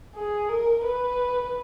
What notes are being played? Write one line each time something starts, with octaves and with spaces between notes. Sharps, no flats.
G#4
A#4
B4